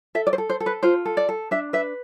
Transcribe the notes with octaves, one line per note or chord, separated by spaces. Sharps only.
A4 E5
D5
C5
A4
C5
A4
B4
F4 C5
A4
D5
A4
D4 E5
B4 E5